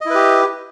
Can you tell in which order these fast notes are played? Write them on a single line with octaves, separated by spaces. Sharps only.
D#5 E4 B4 G4